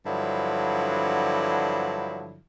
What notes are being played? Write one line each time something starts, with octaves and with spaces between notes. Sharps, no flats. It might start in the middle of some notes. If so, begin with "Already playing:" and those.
G2 D3 F3 F#3 E4